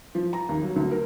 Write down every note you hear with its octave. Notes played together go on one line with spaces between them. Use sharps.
F3
A#5
D#2
F#3
D2
A#4